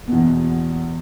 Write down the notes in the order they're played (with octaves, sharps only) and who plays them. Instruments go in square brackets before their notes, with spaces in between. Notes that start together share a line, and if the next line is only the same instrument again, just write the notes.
[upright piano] E2 B2